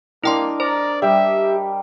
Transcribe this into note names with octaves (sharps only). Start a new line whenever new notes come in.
A#3 D4 E4 A#4 D#5 G5 C6
C5 D5 A#5
G3 G4 E5